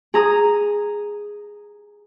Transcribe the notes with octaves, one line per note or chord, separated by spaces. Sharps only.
G#4 A#5 D#6